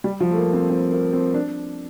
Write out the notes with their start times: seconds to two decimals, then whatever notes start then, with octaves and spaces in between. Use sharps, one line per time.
0.04 G3
0.20 F3
0.31 A3
0.37 A#3
0.53 C4
0.70 C4
0.92 A#3
1.13 C4
1.34 D4